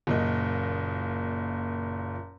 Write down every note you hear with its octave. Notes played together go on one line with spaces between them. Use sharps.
F#1 A#2 D#5